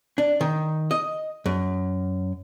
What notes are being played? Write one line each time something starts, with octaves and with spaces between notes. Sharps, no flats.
D4
D#3
D#5
F#2